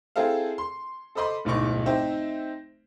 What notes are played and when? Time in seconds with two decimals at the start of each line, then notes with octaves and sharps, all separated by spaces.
0.16 C4 E4 G#4 A4 C5 F5
0.58 C6
1.15 A4 C5 D#5 B5 C6 D6
1.45 D1 B1 G#2 D#4 C#6 D6
1.86 C4 D#4 C5 E5